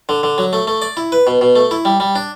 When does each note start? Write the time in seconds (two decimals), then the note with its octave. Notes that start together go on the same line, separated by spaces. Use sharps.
0.09 D3
0.23 D3
0.38 F#3
0.53 A3
0.67 A3
0.82 D5
0.97 E4
1.12 B4
1.27 B2
1.41 B2
1.56 A3
1.71 E4
1.85 G3
2.00 G3
2.15 D4